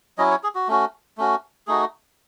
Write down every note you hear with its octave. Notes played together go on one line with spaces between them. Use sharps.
F#3 C#4 E4 D#5
C#5
G#4
F#4
A3 C#4 F#4
A3 C#4 F#4
A3 D#4 F#4 G#4